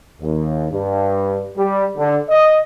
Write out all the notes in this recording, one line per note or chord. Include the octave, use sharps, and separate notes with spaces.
D#2
G2
G3
D3
D#5